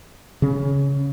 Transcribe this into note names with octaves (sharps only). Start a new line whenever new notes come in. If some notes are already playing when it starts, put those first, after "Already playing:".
C#3 C#4